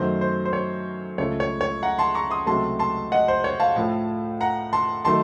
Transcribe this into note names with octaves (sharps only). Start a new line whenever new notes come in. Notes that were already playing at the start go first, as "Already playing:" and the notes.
Already playing: F#2 D#3 F#3 A3 C5
C5
C5
C#5
C#2 C#3 F3 A3 C#5
C#5
C#5
F#5 A#5
A5 C6
A#5 C#6
C6 D#6
C#2 C3 F#3 A3 A5 C6
A5 C6
D#5 F#5
C5
C#5
F5 A5
A2 F3 A3
F#5 A#5
A5 C6
D#3 F#3 A3 A5 C6